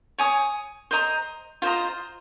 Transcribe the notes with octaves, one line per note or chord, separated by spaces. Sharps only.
C#5 G#5 D#6
C5 D#5 A#5 D#6
F4 C5 D#5 A#5